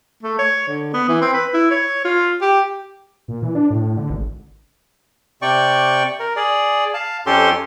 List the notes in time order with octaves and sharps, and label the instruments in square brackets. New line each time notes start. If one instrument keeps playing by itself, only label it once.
[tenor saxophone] A3
C#5
D3
B3
E3
C4
B4
E4
C#5
F4
G4
[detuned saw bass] A#2
E3
D4
A2
D3
G#1
[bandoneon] C3 D5 G5 C#6
A#4
G#4 D5
F5 A5
F2 C#4 G4 A4 C6